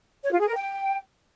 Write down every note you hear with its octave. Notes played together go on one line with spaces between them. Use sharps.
C#5
F4
G#4
A#4
G5